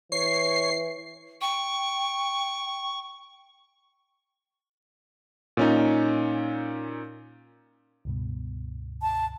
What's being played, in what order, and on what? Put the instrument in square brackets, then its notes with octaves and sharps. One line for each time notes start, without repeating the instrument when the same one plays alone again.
[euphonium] E3 [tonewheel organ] C#5 [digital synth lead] C7
[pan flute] G5 [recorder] C#6
[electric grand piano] A#2 C#4 D#4
[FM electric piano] C#2 G2 B2
[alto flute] A5